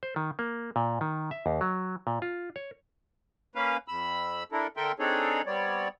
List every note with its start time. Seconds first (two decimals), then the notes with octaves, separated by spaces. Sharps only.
0.03 C5
0.16 D#3
0.39 A#3
0.76 A#2
1.01 D#3
1.31 E5
1.46 D#2
1.61 F#3
2.07 A#2
2.22 F4
2.56 C#5
3.55 A#3 C#4 B4 F5
3.88 F2 B5 E6
4.52 D4 E4 A4 A#4
4.77 D3 A4 A#4 E5 G5 C6
4.99 C4 D4 D#4 G#4 A4 C#5
5.46 G3 B3 C4 C#5 D5